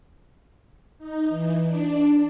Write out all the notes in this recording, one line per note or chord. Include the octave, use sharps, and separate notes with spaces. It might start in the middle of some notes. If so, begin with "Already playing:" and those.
D#4
E3
D4